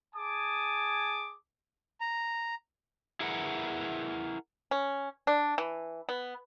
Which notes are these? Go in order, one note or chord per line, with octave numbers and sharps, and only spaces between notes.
G#4 G#5 A5 D6 D#6
A#5
E4 G#4 A#4 B4 F#5
C#4
D4
E3
B3